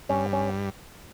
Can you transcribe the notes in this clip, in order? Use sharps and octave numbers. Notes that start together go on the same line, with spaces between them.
G2 C#4
C#4